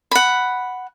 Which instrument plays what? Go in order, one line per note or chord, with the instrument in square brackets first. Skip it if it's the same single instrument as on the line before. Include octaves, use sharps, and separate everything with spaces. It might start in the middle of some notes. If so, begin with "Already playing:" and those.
[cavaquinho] F#5 B5